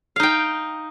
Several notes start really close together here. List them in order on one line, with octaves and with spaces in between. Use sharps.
F5 D#4 G5